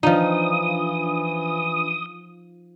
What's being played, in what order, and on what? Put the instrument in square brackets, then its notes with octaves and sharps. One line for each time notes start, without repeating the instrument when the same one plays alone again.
[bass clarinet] E3 [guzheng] F3 D#4 [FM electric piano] D4 F4 [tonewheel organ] D#6